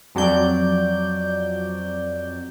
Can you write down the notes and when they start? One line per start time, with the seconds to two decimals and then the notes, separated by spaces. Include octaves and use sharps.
0.15 F2 F#3 D5 G6